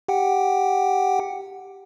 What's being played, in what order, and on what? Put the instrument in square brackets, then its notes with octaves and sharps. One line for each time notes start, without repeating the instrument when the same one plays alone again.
[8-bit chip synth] G4 F#5 G5